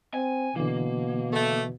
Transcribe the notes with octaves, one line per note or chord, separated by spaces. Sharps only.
C4 G#5
B2 D3 E3 A#3
A3